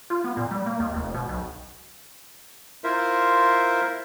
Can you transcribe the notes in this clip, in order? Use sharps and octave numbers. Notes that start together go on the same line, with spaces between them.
F4
B3
A#2
G3
A#3
D#2
F1
B2
B1
E4 F4 A#4 C5 E5